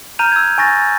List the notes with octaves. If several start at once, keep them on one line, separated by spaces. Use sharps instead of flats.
A#5 F6 G6 D#7 F7
E6 G#6
G#5 C#6 A6 A#6